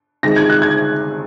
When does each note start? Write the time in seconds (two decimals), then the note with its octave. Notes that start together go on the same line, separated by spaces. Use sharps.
0.23 C3 D#3 G#3 A#6
0.36 G#6
0.50 F#6
0.62 G#6